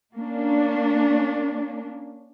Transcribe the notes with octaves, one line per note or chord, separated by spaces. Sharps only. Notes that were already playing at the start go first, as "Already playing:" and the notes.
A#3 C#4 D4